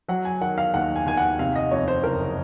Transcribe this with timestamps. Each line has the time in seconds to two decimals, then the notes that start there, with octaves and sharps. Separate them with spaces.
0.08 F#3 F#5
0.25 G#5
0.41 D#3 F#5
0.58 F5
0.74 D#2 F#5
0.96 G#5
1.06 D#2 G#5
1.17 F#5
1.39 C3 F5
1.55 D#5
1.71 F2 C#5
1.88 C5
2.03 F#1 A#4